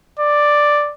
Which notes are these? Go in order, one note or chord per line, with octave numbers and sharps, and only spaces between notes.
D5